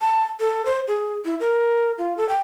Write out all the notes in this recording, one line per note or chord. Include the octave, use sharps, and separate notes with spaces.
A5
A4
C5
G#4
E4
A#4
F4
A4
G5